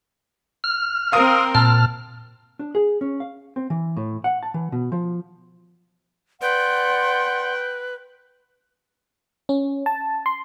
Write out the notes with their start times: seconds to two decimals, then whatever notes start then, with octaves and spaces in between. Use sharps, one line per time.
0.64 F6
1.12 C4 A#4 F5 D#6
1.55 A#2 A5 F6
2.59 D4
2.75 G#4
3.01 C#4
3.20 F5
3.56 C4
3.70 E3
3.97 A2
4.24 F#5
4.43 A5
4.54 E3
4.72 B2
4.92 F3
6.42 B4 D5 F#5 G5 C6
9.49 C#4
9.86 A5
10.26 C6